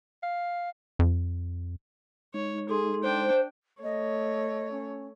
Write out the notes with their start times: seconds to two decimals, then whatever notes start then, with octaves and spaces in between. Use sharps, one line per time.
0.23 F5
0.99 F2
2.34 G#3 D#4 C#5
2.69 G#4 A4 C6
3.04 D4 C5 G5
3.83 A3 C#5 D#5
4.71 C#4